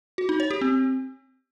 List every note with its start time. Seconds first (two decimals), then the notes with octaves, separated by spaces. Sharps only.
0.18 F#4
0.29 D#4
0.40 C#5
0.51 G4
0.61 C4